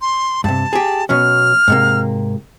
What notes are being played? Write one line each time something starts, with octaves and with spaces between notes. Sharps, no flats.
C6
G2 C3 A5
G4 G#4
B2 F#3 C#4 F6
G#2 C3 A#3